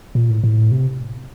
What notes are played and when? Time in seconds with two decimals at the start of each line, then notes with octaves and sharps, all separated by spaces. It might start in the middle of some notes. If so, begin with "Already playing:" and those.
0.15 A#2
0.30 A2
0.44 A2
0.71 C3